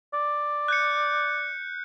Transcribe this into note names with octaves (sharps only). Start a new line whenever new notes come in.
D5
F#6 G6 C#7